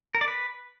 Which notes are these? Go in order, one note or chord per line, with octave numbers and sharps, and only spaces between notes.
A#4
D5
B4